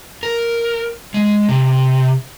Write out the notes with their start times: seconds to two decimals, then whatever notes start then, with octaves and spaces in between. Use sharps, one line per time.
0.23 A#4
1.14 G#3
1.49 C3